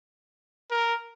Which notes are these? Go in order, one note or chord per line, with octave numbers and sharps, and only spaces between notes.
A#4